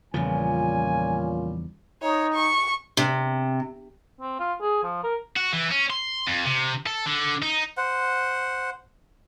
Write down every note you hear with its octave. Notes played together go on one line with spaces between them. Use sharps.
E2 A#2 C#3 F3 G3 C#4 F4 G#5
D#4 C#5
C#6
C3
C4
F4
G#4
F3
A#4
F#4
E3
C#4
C6
F2
C3
A4
D3
D#4
C5 F#5